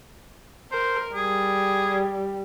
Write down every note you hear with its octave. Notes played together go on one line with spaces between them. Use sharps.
A#4 C5
G3 G#4